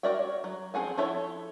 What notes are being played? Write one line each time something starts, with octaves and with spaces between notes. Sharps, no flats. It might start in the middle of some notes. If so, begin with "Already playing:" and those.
F#4 A#4 D5 E5 G5
C#5
F#3
F3 C4 G#4 F#5 G#5
F3 E4 A4 C#5 E5